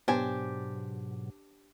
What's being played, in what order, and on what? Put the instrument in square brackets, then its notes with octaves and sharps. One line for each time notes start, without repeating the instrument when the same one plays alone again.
[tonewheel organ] G#2 B2 F#3 [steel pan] B3 [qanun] D4 G4 [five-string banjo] C5 G#5